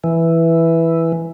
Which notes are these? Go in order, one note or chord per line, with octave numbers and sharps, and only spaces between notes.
E3